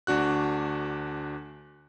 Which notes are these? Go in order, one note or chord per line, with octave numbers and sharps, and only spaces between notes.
D2 D4 F#4 F#6